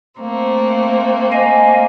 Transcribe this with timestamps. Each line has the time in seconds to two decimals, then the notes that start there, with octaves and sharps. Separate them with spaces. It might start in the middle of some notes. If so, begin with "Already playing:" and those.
0.20 A3 A#3 C4
1.32 D#5 F5 G#5